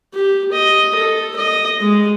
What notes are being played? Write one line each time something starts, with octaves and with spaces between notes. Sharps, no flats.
G4
D#5
A4
D#5
G#3